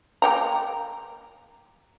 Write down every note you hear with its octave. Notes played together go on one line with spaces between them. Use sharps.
A#3 G5 A#5